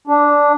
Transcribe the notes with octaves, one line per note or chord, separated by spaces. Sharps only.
D4